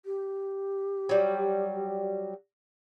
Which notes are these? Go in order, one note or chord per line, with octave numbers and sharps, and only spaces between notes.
G4
F#3 G3